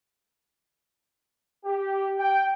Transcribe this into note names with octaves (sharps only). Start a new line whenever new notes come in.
G4
G5